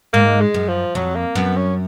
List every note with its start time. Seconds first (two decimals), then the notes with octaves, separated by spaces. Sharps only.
0.13 G#2 A#3
0.41 G#3
0.54 F#2
0.68 F3
0.95 F2 F#3
1.15 A#3
1.35 F#2 B3
1.56 C#4